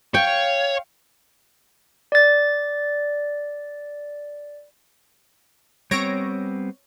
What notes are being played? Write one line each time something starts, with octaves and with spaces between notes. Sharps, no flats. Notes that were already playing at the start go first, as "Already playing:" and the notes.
C#5 F5 G5
D5 A6
G3 B3 C4 C#5 A#6 D7